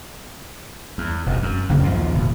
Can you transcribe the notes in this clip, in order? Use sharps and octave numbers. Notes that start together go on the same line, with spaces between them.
E2
E1 F2
F#2
G1 F#2 C#3 A#3
A#1 D#2 F3
D1 B2